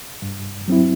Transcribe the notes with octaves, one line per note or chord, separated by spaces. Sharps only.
G2
F#3 C4 E4